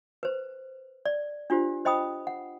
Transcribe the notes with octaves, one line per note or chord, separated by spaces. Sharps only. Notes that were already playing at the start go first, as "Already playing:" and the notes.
B4 C5
D5
D4 F4 G4 C5
C5 D#5 G5 B5 D#6
F#5